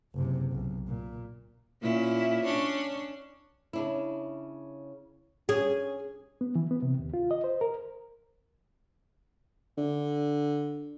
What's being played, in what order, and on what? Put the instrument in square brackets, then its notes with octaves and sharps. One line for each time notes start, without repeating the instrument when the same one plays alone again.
[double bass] F#1 C3
B1
A#2
[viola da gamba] A#2 C#4 E4
C#4 D4 C#5
[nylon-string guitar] C#3 D4 E4
[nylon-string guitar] C#4 [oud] G#4
[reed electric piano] B3
E3
B3
C3
D#2
F4
D#5
C5
A#4
[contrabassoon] D3